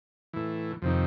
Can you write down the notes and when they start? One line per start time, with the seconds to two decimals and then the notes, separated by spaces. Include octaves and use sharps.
0.33 A2 E3
0.82 F2 C3 D#3